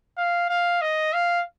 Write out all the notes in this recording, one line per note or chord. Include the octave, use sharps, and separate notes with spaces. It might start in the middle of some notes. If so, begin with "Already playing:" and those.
F5
F5
D#5
F5